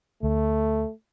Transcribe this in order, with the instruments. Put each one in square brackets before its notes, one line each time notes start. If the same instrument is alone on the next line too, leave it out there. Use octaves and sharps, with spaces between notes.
[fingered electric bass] D2 [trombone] A3